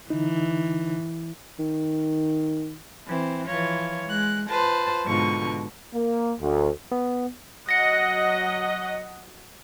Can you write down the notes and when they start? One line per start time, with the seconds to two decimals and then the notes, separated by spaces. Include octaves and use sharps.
0.10 D3 E3 D#4
1.59 D#3
3.06 E3 C4
3.47 E3 F3 F4 C#5
4.05 G#3 F#6
4.49 F4 B4 C5 A5
5.04 G#2 B2 D3 F3 C#6
5.94 A#3
6.40 D2
6.92 B3
7.69 F#3 D#5 F#5 A#6 C#7